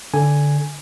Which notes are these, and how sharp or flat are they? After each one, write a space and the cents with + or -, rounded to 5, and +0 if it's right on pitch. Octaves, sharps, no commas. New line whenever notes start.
D3 -15 G#5 +0